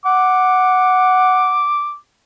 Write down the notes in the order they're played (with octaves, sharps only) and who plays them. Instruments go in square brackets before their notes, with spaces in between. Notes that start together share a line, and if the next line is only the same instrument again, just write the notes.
[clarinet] F#5 [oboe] D6